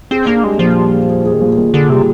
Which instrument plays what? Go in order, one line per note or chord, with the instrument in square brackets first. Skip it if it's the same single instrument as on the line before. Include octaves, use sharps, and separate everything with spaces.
[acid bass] C4 [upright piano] G#4
[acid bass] A#3 [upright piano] D4
[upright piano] G3 [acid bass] G#3
[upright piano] A#2 [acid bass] F3
[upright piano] G3
G#4
G#4
G#4
[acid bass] D#3
[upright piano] A#2 [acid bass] F3
[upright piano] A#2 [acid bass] D#3
[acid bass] D3 [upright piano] G#4
[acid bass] C3 [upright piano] G3